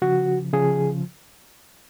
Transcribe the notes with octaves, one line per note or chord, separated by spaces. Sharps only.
C#3 F3 F#4
C#3 F3 G#4